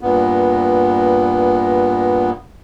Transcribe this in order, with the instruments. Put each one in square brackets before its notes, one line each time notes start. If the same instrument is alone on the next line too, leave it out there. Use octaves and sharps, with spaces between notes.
[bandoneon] G2 A#2 B3